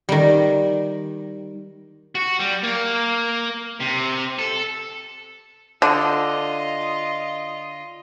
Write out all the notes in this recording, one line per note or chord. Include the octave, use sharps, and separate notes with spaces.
D#3 G3
F#4
G3
A#3
C3
A4
D3 F4 D#5